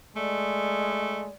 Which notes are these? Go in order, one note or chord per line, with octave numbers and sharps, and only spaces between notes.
G#3 A3 D5